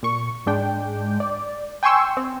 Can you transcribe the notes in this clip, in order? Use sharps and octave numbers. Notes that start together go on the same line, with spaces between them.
A#2 C#6
G#2 G#3 D4 G5
D5
G5 G#5 C6 C#6 E6
C4